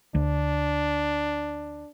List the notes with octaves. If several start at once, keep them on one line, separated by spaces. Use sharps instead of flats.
D2 D4